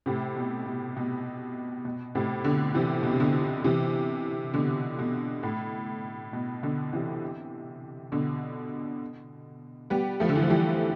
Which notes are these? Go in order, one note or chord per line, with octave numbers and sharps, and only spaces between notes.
A2 C3
B2
B2
B2
B2
A2 C3
B2 D3
C3 E3
B2
C3
B2 D3
C3 E3
B2 D3
B2
A2
B2
B2 D3
C3 E3
B2 D3
G3 B3
F3 A3
D3
E3
F3
E3 G3